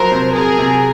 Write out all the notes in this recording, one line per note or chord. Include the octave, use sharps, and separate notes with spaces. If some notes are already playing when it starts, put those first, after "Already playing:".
Already playing: F3 F#3 A#4 C5
C3
C3 G#4 A#4
C3